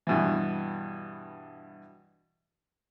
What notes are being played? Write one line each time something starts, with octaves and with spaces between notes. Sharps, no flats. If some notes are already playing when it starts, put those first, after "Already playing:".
G2 B2 E3